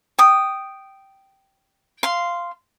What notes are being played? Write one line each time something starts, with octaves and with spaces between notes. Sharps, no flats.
G5 D#6
F5 C6